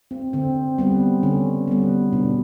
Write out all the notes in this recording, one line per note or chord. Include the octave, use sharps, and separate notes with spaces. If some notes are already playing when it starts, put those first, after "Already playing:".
C4
D3 C4
G3 B3 C4
D3 C#4
G3 B3
B2 D4